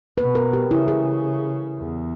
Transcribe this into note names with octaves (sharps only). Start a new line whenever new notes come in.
B2 B4
A#4
G4
C#3 E4
G#4
E2